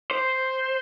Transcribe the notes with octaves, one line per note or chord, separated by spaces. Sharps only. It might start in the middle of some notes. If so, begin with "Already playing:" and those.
C5